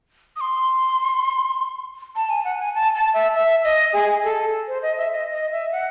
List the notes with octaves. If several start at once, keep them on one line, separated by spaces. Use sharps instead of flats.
D#6
C6
A5
G#5
F#5
G#5
A5
A5
E5
E5
D#5
G#4
A4
C5
D#5
E5
D#5
D#5
E5
F#5